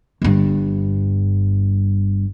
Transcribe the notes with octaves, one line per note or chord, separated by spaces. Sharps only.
G1 G2